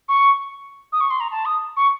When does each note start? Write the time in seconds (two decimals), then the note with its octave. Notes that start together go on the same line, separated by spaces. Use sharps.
0.09 C#6
0.92 D#6
1.01 C#6
1.10 C6
1.20 A#5
1.31 A5
1.45 D#6
1.77 C#6